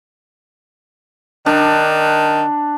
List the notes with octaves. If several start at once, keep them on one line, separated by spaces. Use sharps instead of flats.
D#3 D4